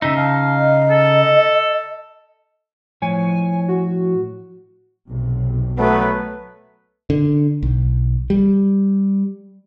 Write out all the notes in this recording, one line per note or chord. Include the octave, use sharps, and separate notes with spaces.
C#3 D#4 E5
F5 A5
D#5
A4
A2 F3 C#5 G#5
F#4
B1 C3
F#3 A3 B3 B4
D3
B1
G3